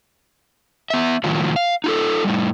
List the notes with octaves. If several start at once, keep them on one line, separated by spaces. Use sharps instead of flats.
B3 E5
A2 D#3 F3 F#3
F5
D#4 F4 A4
A2 G3